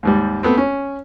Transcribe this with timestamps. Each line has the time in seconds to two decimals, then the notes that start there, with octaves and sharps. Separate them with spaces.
0.03 D#2 G#2 G3
0.43 A3 B3 C4
0.57 C#4